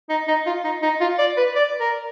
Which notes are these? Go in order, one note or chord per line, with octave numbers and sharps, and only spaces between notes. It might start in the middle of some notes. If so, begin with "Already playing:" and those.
D#4
D#4
F4
D#4
D#4
F4
D5
B4
D5
A#4